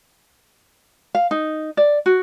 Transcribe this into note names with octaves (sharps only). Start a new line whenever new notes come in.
F5
D#4
D5
F#4